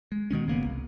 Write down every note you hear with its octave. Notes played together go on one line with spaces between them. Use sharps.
G#3
B2 D#3 G#3 C#4
G1 C#3 A#3 B3
C2